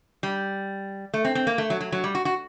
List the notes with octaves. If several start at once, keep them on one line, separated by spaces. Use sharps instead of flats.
G3
A3
C4
C4
A#3
A3
F#3
F#3
F#3
G3
F#4
F#4